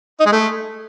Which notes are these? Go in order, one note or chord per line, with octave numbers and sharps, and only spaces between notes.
D#4
G#3
A3